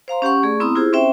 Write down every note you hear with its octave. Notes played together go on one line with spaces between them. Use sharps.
C5 F5 A#5 C6
C#4 G4 F#5 C#6
A3 G#4 D5 C#6
B3 C4 E4 A#5 D#6
E4 F4 G4 G#4 C5
C4 C#4 C5 E5 G5